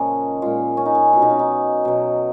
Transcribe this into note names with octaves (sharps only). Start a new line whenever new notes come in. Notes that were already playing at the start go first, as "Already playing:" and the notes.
Already playing: A#2 C#3 F3 G#3 C#4 D#4
A#2 G#3 F4
C#4
D#4
C#4
B2 F#3 F4
D#4
C#4
D#4
B2 F#3